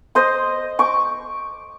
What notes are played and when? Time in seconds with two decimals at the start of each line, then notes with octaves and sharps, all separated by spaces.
0.15 C5 D#5 C6
0.79 C#6 D6